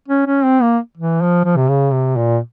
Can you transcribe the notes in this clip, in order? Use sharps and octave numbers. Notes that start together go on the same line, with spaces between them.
C#4
C#4
C4
A#3
E3
F3
F3
C3
C#3
C3
A#2